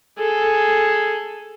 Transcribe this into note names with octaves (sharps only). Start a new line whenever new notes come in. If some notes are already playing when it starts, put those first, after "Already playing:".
G#4 A4